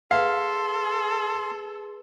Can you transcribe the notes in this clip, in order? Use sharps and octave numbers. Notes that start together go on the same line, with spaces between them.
G#4 A4 B4 F5 C6